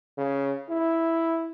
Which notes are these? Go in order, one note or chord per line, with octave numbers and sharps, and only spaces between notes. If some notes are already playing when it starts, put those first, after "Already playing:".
C#3
E4